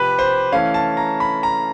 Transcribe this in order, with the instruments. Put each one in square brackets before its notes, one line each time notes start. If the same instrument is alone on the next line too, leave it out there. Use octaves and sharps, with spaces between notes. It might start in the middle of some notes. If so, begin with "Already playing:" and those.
Already playing: [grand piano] C3 F3 G4 B4
C5
E3 A3 C#4 F5
A5
A#5
B5
A#5